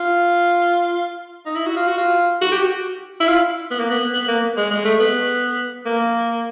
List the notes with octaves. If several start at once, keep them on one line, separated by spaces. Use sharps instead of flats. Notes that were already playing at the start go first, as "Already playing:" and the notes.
Already playing: F4
D#4
E4
F#4
F4
F#4
F4
F#4
G4
F#4
E4
F4
B3
A#3
B3
B3
A#3
G#3
G#3
A3
B3
A#3